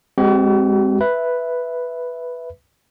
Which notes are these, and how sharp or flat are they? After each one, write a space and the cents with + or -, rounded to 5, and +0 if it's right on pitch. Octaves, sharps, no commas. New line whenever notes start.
G#3 -20 C4 +0 F#4 +45
B4 +0 E5 +0